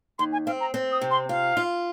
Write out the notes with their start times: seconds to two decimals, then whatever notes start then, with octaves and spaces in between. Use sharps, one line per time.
0.19 D#2 C6
0.32 G#5
0.46 C4 F5
0.60 A#5
0.74 C4
0.92 D#6
1.02 C3
1.11 C6
1.29 F4 F5
1.57 F4